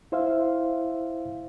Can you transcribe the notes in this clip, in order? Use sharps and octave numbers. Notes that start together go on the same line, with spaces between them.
E4 C5 E5 F5